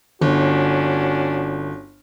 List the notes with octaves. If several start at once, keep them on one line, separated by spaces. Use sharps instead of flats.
G1 C#4 D4 F#4